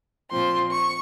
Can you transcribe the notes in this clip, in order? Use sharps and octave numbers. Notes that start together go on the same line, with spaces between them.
A#2 F3 C4 C6
C#6